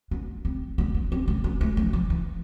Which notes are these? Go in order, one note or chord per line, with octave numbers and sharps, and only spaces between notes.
B3
C4
B3
B3
C4
B3
B3
A3
F3
F3
E3